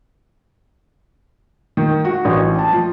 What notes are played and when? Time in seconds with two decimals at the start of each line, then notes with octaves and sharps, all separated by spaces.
1.77 D#3
2.05 F#4
2.25 A1
2.59 A5
2.72 F3